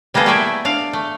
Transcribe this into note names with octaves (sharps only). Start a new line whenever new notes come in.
G3 A#3 B3 G#4 A4
A3 E4 G4 G#4 D5 E5
D4 F5
A3